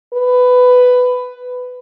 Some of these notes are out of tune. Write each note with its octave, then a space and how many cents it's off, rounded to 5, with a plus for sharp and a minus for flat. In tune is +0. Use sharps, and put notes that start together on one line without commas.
B4 +15